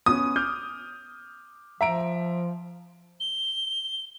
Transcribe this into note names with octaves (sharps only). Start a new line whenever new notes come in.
B3 C#4 D#6
D6 F6 G6
F3 E5 A#5 D7
G7